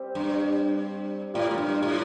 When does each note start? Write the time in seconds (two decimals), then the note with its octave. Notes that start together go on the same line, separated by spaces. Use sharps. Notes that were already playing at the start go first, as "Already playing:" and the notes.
Already playing: G3 C4 G4
0.15 G2
1.34 A2 G3 A#3 F4
1.51 A2
1.58 G2
1.83 A2